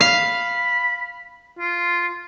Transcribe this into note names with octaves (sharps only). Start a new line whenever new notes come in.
F5 B5
F4